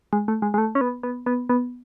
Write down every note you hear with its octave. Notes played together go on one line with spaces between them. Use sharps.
G#3
A3
G#3
G#3
A3
C#4
B3
B3
B3
B3